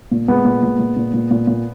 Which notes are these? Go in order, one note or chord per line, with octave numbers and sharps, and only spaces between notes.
A#2
A#2 G#3 B3
A#2
A#2
A#2
A#2
A#2
A#2
A#2